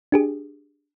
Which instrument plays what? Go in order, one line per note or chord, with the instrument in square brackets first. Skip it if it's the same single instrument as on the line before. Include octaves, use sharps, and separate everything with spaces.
[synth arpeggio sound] D4 G4 G#4